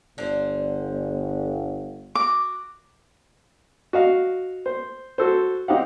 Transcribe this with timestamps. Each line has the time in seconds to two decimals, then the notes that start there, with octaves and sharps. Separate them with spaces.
0.18 G1 D3 C5
2.15 F#4 D6
3.93 F#4 D#5 F5
4.66 C5
5.18 F#4 A4 C5
5.68 C4 D#4 G4 F5 F#5